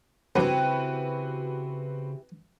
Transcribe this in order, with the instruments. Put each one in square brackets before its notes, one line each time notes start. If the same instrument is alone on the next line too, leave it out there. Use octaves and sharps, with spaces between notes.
[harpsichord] E2 G2 [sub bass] C#3 [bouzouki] E3 G4 [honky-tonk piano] C4 F#4 B4